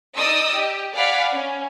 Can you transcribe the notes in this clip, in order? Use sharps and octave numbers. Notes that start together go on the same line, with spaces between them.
D#4 D5 D#5 D#6 E6
G4
D5 F5 F#5 G#5 B5
C#4